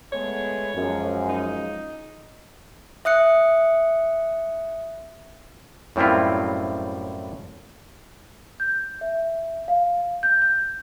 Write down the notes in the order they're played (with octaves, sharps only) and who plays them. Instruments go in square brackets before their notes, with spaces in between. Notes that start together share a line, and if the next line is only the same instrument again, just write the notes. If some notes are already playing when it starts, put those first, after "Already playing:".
[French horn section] G#3 A3 B3 [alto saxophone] C#5
[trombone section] F#2 [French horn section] F3 G#3
[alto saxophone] D#4
[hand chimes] E5 D#6 F#6 C#7
[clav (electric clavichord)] F#2 A2 G3 C4 E4 F4
[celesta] G6
E5
F5
G6
G6